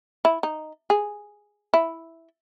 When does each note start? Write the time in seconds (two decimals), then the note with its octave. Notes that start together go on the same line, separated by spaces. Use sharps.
0.25 E4
0.43 D#4
0.90 G#4
1.74 E4